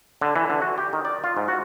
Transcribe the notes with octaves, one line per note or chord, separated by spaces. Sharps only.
D3
E3
D3
F#4
G4
D#3
D5
F4
G#2
F#4